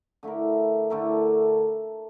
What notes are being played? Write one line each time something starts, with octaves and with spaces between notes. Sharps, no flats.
D3 A3 E4 A#4
D3 A3 E4 A#4